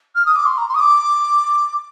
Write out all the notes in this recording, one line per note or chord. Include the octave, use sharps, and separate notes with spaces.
F6
D#6
D6
C6
A#5
C6
D#6
D6